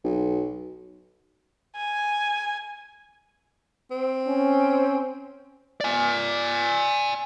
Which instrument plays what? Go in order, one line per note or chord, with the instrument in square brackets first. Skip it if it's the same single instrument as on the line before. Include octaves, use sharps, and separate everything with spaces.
[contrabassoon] B1
[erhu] G#5
[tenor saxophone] C4
[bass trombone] C#4
[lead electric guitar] D5 G#5